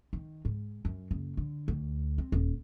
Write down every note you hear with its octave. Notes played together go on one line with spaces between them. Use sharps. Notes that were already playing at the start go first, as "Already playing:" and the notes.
D#3
G#2
F#2
F#1
D3
D2
C4
D#1